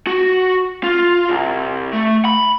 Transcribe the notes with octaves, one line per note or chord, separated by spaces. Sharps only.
F#4
F4
C2
A3
B5